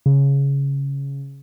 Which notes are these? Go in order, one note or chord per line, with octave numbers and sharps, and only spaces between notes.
C#3